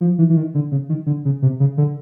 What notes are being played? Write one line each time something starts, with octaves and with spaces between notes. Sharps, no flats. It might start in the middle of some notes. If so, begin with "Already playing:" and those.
F3
E3
E3
D#3
D3
C#3
D#3
D3
C#3
C3
C#3
D3